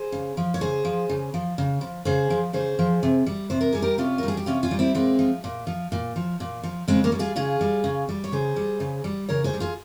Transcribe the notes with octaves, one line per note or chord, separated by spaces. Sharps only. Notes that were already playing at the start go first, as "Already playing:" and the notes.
Already playing: G#4 C5
C#3
F3
C#5
C#3 G#4 C5
F3
C#3
F3
C#3
F3
C#3 G#4 C5
F3
C#3 G#4 C5
F3
C3
G3
C3 C5
A#4
G3 G#4
G4 A#4
C3 C#4 F4
A#4
G3
G#4
G4
C3 C#4 F4
C#4 F4
G3
C4 E4
A#2 G#3 C4
F3
A#2
F3
A#2
F3
A#2
F3
C#3 G#3 C4
A#3 C#4
G3
F4 G#4
C#3 F4 G#4
G3
C#3
G3
C#5
C#3 G#4 C5
G3
C#3
G3
C#3 A#4 C#5
G#4 C5
G3
F4 G#4